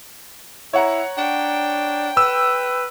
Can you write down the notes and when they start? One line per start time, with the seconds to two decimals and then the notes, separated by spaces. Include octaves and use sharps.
0.73 E4 C#5 F#5 A#5
1.18 D4 G5
2.17 B4 E6